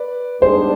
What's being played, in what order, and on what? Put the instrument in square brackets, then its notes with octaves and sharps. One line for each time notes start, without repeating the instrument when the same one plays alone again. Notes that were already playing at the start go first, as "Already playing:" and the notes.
Already playing: [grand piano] B4 D5
[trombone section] G#2 G3 B3 D4 [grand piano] G#4 C5